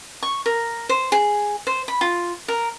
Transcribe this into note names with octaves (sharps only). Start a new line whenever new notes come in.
C#6
A#4
C5
G#4
C5
B5
F4
A#4